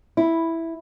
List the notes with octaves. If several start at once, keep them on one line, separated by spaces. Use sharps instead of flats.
E4